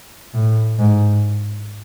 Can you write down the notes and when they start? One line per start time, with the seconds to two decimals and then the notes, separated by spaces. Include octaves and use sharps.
0.34 A2
0.79 G#2